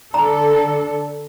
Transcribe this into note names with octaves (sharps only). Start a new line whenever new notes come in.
D3 D4 A4 A#5